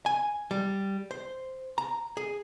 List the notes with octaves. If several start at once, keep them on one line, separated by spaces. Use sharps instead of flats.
G#5
G3
C5
A#5
G#4